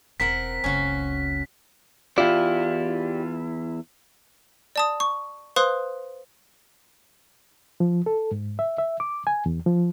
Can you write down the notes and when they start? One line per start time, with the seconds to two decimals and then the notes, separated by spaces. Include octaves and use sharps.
0.20 E1 C4 A#4 F#5 B6
0.64 F#1 C#2 C#4 F#4 F5
2.18 E2 E4 F4 G4 D5
4.76 D5 A5 D#6
5.00 C#6
5.56 B4 C5 F5 C6 D#6 F#6
7.80 F3
8.06 A4
8.32 G#2
8.59 E5
8.78 E5
9.00 D6
9.27 G#5
9.46 E2
9.66 F3